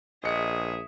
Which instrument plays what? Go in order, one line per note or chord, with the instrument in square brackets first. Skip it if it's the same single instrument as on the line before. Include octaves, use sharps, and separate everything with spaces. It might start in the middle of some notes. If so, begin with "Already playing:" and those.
[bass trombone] A#1 [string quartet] G#4 E5 [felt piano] D#5 C#7 [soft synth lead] D#6